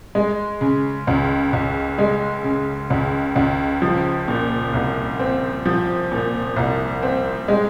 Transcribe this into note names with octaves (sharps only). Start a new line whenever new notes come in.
G#3
C#3
C#2
C#2
G#3
C#3
C#2
C#2
F3
A#2
C2
C4
F3
A#2
C2
C4
G#3